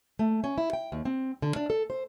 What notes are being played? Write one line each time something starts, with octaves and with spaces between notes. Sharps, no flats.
A3
C#4
E4
G5
D#2
C4
D3
D4
A4
C5